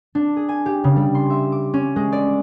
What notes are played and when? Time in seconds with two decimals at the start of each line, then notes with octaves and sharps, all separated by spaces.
0.15 D4
0.36 G#4
0.49 G#5
0.66 G4
0.84 C#3
0.96 G3
1.15 C6
1.30 E5
1.52 D6
1.74 C#4
1.96 G#3
2.12 D5